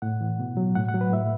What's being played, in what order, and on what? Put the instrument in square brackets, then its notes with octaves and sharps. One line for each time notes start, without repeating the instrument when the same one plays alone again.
[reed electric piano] A2 F#5
E3
B2
F#3
A2 F#5
F#5
F#3
B4
A2 E5